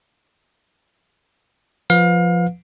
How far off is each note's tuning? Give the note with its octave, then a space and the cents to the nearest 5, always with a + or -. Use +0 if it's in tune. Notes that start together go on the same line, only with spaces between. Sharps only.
F3 +0 B4 +0 F5 +30